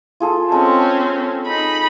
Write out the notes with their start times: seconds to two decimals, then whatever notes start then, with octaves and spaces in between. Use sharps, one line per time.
0.20 F4 G#4 A4
0.52 G#3 C4 C#4 A4
1.46 D#4 B5